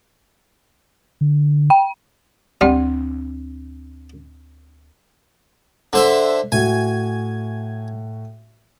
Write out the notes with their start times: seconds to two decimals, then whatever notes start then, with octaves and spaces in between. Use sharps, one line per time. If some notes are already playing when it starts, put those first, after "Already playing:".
1.21 D3
1.70 G5
2.61 D2 G3 C4
5.93 D3 C5 E5
6.52 A2 F#4 G#5